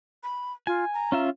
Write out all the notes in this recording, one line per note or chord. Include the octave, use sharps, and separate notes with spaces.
B5
F4 G#5
A#5
C#4 F4 E5